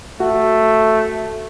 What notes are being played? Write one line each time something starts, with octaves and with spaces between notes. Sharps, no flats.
A3 F#4